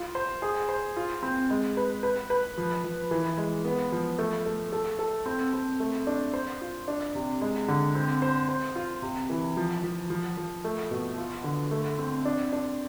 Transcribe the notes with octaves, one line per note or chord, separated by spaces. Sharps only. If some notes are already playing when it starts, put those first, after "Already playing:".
Already playing: F4
C5
G#4
C5
F4
C4
G#3
B4
B4
B4
F3
F3
E3
G#3
B3
F3
A3
A3
A4
A4
C4
C4
A3
D4
C5
F4
D4
C3
G#3
D3
C4
C5
C5
F4
C3
E3
F3
F3
F3
F3
A3
B2
F4
D3
A3
C4
D4
D4